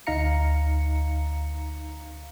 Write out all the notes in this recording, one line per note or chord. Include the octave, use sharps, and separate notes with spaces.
D2 D#4 F5 A#5 C#7